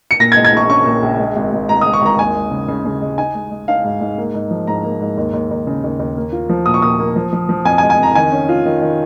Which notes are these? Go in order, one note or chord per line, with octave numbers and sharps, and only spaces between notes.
C#7
A#2 A#6
G#6
G#3
G#6
A#1 C#6
C#4 C#6
A#2
A#1
G#3
G#1
G#1
G#3 A#5
D#6
G#3
C#6
G#1 A#5
D#2 G#5
G#3
C#3
C#3
C#3
G#3
D#4 G#5
G#3
G#3
D#4 F5
G#2
G#2
A#3
G#2
F3
G#2 A#5
A#3
G#2
D#2
D#2
D#2
C#3
D#2
D#2
A#3
F4
F3
A#2 D#6
C#6
A#2 D#6
A#3
F3
F3
F3
F2 G#5
G#5
G#3
G#5
F2 A#5
D#3 G#5
C#4
F4
D#3
D#3